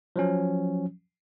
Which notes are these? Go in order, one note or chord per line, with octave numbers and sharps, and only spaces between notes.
F3 F#3 C#4